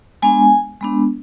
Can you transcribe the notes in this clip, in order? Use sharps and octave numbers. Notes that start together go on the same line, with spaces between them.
G#3 B3 D4 G#5
G#3 B3 D4